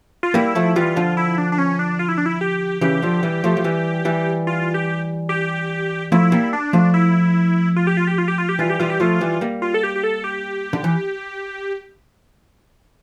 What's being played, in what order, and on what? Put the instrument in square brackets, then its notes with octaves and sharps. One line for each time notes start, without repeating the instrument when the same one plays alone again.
[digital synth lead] F4
[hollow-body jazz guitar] G3 A#3 [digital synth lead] E4
[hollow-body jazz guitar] F3 A3
[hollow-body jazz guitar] E3 G3 [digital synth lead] F4
[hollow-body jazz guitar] D3 F3
[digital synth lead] E4
D4
D4
C#4
D4
F4
E4
D4
E4
G4
[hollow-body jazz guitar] C#3 E3 [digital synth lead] G4
[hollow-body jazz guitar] D3 F3
E3 G3
F3 A3
F3
E3 G3
E3 G3
[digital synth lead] F4
G4
G4
[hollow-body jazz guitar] F3 A3 [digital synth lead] E4
[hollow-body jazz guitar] G3 A#3
[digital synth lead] D4
[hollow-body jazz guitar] F3 A3
[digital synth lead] E4
F4
G4
F4
G4
F4
G4
F4
G4
[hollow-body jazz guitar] E3 G3 [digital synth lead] F4
[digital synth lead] G4
[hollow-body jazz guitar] E3 G3 [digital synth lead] F4
[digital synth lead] G4
[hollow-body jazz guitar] F3 A3 [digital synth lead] F4
[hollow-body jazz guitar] E3 G3
G3 A#3
[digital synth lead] F4
A4
G4
G4
A4
G4
[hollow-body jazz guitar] D3
E3